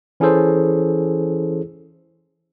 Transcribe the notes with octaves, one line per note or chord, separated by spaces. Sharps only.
E3 C#4 E4 G#4 A4 C5